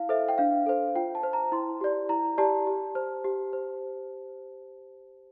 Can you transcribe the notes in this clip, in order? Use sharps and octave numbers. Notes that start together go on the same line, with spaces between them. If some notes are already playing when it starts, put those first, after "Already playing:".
Already playing: E4 F5
A4 C5 E5
G5
D4 F5
A4 C5
F4 G5
A5
C5
A#5
E4 C6
G4 D5
E4 A#5
G4 D5 A5
G4
C5
G4
C5